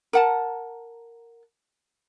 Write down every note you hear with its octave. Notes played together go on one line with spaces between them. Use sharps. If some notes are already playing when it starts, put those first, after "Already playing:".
A#4 F#5 A5